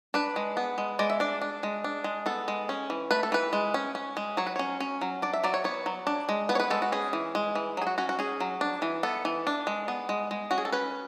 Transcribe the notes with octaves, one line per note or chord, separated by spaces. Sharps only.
D4 B4
G#3
B3
G#3
G#3 D5
E5
D4 D5
D4
G#3
D4
G#3
B3 A4
G#3
C#4
E3
A3 B4
A4
E3 B4
G#3
C#4
C#4
G#3
F#3 C#5
B4
C#4 C#5
C#4
F#3
D4 D5
E5
F#3 D5
C#5
B3 C#5
F#3
D4
G#3
B3 B4
C#5
B4
G#3 A4
F#4
C#4 G#4
E3
G#3
E3
F#3 G#4
F#4
C#4 F#4
F#4
C#4 G#4
F#3
D4
E3
B3 A4
E3
D4
G#3
B3
G#3
G#3
C#4 F#4
G#4
A4
C#4 B4